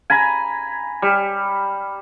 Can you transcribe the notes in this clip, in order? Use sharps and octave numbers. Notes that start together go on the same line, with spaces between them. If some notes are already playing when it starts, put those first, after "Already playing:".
G#5 A#5 B5
G3